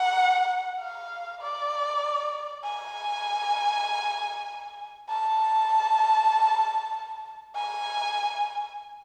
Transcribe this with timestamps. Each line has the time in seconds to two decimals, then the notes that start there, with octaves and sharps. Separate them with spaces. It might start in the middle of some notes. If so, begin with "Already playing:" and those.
Already playing: F#5
0.80 F5
1.41 D5
2.64 G#5
5.10 A5
7.56 G#5